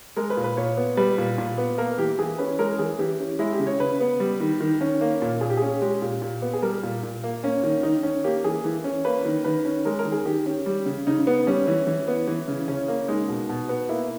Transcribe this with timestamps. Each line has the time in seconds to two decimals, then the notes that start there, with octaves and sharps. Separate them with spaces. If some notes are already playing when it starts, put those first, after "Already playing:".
0.16 G#3 A#4
0.30 B4
0.37 A#2
0.44 B4
0.57 A#2 C#5
0.77 B3
0.97 G3 B4
1.18 A#2
1.38 A#2
1.58 B3
1.78 A#3 A#4
1.98 E3 G4
2.19 E3 G#4
2.38 C#4 B4
2.59 G#3 A#4
2.79 E3 G#4
2.99 E3 G4
3.19 C#4
3.39 G#3 E4
3.53 G4
3.59 C#3
3.67 C#5
3.80 C#3 B4
4.01 B3
4.20 G3
4.41 D#3
4.61 D#3
4.81 C#4
5.01 A#3
5.22 A#2
5.41 A#2 G#4
5.50 G4
5.57 C#4 G#4
5.82 G#3 G4
6.02 A#2
6.22 A#2
6.42 B3
6.53 G#4
6.62 G3 A#4
6.83 A#2
7.03 A#2
7.24 A#3
7.43 A#3 C#4
7.63 D#3
7.83 D#3 D#4
8.03 C#4
8.24 A#3 G4
8.44 E3 G#4
8.64 E3
8.84 C#4
9.05 A#3 B4
9.25 D#3
9.44 D#3 B4
9.65 C#4
9.85 G#3 A#4
9.99 A#4
10.05 D#3
10.12 G#4
10.26 D#3 G4
10.46 C#4
10.66 G3
10.86 C#3
11.07 C#3 D#4
11.27 B3
11.47 G3 C#4
11.67 E3
11.87 E3
12.08 B3
12.27 E3
12.48 C#3
12.68 C#3 C#4
12.88 A#3
13.08 G#3 D#4
13.29 B2
13.49 B2
13.69 B3
13.89 A#3 E4